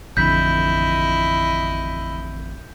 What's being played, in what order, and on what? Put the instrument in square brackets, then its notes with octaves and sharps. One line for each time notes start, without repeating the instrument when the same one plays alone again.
[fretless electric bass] A1 F2 D3 [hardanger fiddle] E4 D#5 [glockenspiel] G6 B6